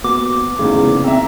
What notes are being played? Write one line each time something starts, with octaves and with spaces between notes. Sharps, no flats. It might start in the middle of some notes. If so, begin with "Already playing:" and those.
A#3 B3 F#4 D6
E2 G#2 C#3 E3 A3
C3 A#3
C4 E5 A#5